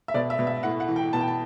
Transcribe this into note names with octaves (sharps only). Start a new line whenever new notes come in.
E5
B2 D5
E5
B2
E5
A2 F#5
F#5
E3
G5
B2 A5
G5
A5